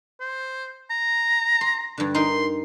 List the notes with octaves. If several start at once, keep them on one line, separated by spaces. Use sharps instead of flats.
C5
A#5
C6
G2 D3
D#4 A#4 C6